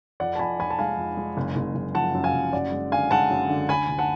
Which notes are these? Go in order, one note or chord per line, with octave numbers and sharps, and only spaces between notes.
F2 D5 F#5
A5
F2 G#5 B5
F2 G#5 B5
A5
G#3 F5 G#5
F2
G#3
F#1
F#1
F#1
F3 F#5 A5
F#2
F5 G#5
F#1
F#2 D5 F#5
G#3
D3 F5 G#5
G#3 F#5 A5
F#2
D3
D2 G#5 B5
D2
F#5 A5